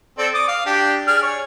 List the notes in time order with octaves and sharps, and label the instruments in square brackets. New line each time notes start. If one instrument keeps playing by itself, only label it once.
[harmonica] C4 A4 D5
D6 D#6
F5
D4 G4
G#4 D5 F6
C#5